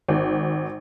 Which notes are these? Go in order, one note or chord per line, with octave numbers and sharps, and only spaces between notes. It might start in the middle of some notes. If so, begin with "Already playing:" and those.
G#1